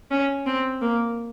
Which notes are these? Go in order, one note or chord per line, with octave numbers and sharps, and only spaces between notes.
C#4
C4
A#3